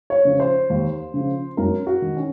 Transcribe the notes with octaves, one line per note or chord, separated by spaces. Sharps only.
C#5
C#3 F3
C5
D#2
C#3 F3
F#2 A#4
F#4
D#3
C#4